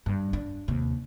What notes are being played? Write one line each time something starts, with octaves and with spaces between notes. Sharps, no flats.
G2
D4
D#2 C3